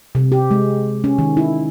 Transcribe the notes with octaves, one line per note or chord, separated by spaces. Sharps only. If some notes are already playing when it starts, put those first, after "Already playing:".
C3
G4
G#3
C#4
D#3
E4